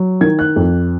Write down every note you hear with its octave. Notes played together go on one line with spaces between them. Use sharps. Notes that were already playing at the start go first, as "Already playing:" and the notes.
Already playing: F#3
D#3 G#6
F#6
F2